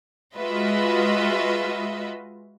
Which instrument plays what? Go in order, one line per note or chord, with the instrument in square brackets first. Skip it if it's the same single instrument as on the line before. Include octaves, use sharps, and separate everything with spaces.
[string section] G#3 F4 F#4 B4 D#5 E5